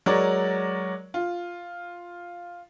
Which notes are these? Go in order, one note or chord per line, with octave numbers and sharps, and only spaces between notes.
F#3 G#3 A#4 C#5 D5
F4